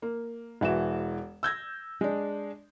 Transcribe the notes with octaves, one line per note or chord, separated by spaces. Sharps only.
A#3
E1 E3 F#4 E7
E6 G6 G#6 A#6
G#3 D4